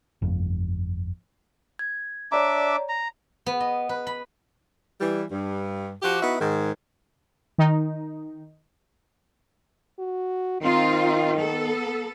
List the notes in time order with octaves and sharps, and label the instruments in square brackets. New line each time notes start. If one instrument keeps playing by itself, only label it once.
[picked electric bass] G1 F2
[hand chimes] G#6
[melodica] D4 E5 D6 [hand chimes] C#5 D5 A#5
[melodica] A#5
[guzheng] B3
D#5
B4
B5
[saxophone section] E3 G3
G2
F3 F#4 G4
B3 D#4 E4 F#4
G#2 D#3
[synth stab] D#3 D#4
[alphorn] F#4
[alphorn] D#3 [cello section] C4 D#4 F4
[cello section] B3 A4